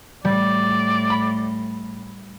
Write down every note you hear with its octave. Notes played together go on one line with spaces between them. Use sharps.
A2 G3 D5
B5